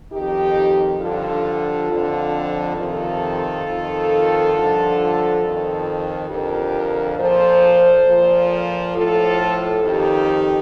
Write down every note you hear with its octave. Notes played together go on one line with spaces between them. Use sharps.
F2 D#3 D#4 G4
G2 D3 F3 F4 A4
F2 D3 F3
F2 C3 D#3 F4 A4
F2 D#3
G2 D3 F3
F2 D#3
F2 D3 F3 G4 A#4
A#2 F3 A4 C5
A#2 F3
A2 F3 F4 A4
F2 D#3 D#4 G4